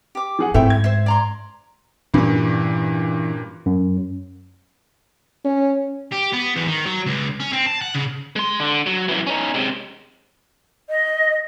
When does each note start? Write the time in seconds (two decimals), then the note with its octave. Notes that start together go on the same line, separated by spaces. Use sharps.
0.15 G4 D6
0.39 F3 G#4 F#5
0.54 G#2 A3 C4 E4 C#5 E5 G5
0.70 G#6
0.84 C5 E5
1.06 D5 A#5 C6
2.14 G2 A#2 E3 C#4
3.66 F#2
5.45 C#4
6.12 G4
6.33 B3
6.56 E2
6.67 D#3
6.86 F#3
7.06 C#2
7.40 C#4
7.52 C4
7.66 A5
7.82 F#5
7.95 C#3
8.36 G#3 C6
8.60 D3
8.86 F#3
9.09 F#2 E3
9.27 C#4 D#4
9.54 C3 G#3
10.90 D#5